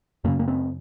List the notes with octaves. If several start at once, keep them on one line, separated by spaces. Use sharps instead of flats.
F#2 C#3 A#3
A#3
C4